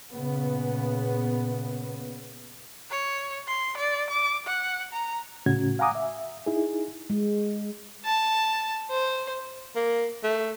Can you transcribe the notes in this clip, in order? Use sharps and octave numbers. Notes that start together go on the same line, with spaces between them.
A#2 C#3 B3
C#5
C6
D5
D6
F#5
A#5
C#2 A2 C#3 C#4 F#4 G#6
F5 F#5 G#5 A#5 D6 D#6
E5
D#4 E4 G#4
G#3
A5
C5
A#3
A3